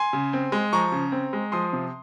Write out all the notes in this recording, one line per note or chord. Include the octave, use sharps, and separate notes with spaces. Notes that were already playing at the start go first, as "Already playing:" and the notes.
Already playing: G#5 C6
C#3
C4
G#3
F3 A#5 C#6
C#3
C4
G#3
F3 C6 D#6
C3